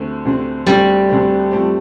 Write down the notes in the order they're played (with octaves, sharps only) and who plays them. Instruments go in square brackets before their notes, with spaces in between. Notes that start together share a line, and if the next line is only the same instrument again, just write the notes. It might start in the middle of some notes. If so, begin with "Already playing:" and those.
Already playing: [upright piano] D2 D3 A3 C4
D2 D3 A3 C4
[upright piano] D2 D3 A3 C4 [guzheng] G3
[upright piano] D2 D3 A3 C4
G2 F3 A3 C4 G4